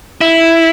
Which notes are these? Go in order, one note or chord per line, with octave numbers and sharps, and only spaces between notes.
E4